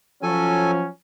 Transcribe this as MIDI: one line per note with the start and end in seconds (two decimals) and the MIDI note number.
0.23 0.87 53
0.23 0.87 54
0.23 0.87 61
0.23 0.71 69
0.23 0.71 80